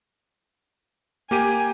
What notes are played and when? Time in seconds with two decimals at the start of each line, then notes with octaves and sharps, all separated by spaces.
1.31 A#3 G4 G#5 D#7